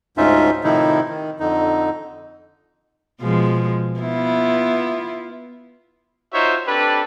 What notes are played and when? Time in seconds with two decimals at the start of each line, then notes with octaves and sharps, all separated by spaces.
0.17 D2 G#2 C#4 D#4 F4 E5
0.64 A2 C3 D#3 F3 D#4 E4
1.09 D#3
1.40 F2 D3 D#4
3.21 B2 F3 G#3
3.99 B3 E4 F4
6.33 D#4 F4 F#4 C5 C#5 E5
6.67 C4 D4 G4 A4 B4